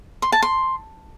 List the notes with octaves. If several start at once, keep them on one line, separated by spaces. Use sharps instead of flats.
C6
A5
C6